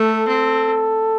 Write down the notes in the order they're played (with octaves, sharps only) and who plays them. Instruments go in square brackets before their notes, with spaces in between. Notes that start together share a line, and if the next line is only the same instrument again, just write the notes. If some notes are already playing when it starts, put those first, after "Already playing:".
Already playing: [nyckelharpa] A3 [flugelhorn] A4
[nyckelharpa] C4